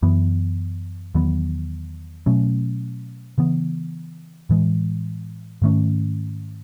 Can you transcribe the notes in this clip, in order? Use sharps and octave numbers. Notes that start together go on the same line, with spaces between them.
F#2 E3 B3
E2 D#3 F#3 B3
B2 F#3 A3 C#4
C#3 E3 B3
A2 E3 G#3
G#2 D#3 A3 C#4